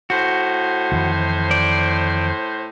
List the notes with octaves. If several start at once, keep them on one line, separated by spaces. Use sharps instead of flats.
A2 F#4 C5
F2 D#3 E3
D5